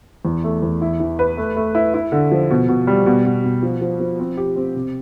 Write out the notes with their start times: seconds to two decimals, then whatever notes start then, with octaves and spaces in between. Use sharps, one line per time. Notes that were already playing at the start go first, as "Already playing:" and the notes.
0.25 E2
0.44 A3
0.62 E2
0.82 E4
1.00 E3
1.19 B4
1.37 A3
1.56 A3
1.75 E4
1.94 E4
2.12 D3
2.32 F3
2.50 B2
2.68 B2
2.87 G3
3.06 B2
3.25 B2
3.44 B2
3.63 F3
3.81 F3
4.00 F3
4.19 C4
4.37 G4
4.56 C4
4.75 C3